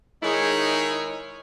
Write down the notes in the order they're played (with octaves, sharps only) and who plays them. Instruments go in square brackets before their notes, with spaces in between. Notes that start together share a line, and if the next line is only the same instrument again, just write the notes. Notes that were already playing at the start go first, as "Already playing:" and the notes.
[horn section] D#3 G#3 D#4 E4 G#4 C#5